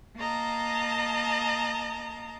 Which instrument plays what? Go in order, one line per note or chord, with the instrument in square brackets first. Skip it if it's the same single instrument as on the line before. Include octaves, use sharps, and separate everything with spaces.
[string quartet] A#3 D#5 A5 A#5